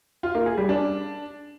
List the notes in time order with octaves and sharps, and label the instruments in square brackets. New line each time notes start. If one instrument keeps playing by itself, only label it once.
[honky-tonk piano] F4
A#3
G#4
G3
D4